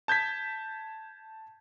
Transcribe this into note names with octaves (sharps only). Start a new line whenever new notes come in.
A5 G6 G#6 B6